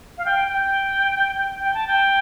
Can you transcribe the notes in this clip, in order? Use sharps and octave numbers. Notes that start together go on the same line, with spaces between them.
F5
G5
G5
G5
A5
G5